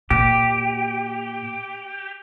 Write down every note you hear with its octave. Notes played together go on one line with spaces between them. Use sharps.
A#2 G4